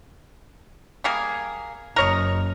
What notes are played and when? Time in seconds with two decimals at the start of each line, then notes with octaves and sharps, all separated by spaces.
1.04 G3 A#3 G#4
1.96 F#1 A#4 C#5 D#5